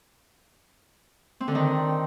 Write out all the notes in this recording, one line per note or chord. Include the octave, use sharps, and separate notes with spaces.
C4
D3
D#3